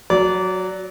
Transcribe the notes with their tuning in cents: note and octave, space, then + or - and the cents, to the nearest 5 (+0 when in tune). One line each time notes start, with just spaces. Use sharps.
F#3 +0 D5 -25